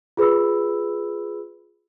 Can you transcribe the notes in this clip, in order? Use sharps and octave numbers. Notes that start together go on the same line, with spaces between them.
F4 G#4 B4 B5 E6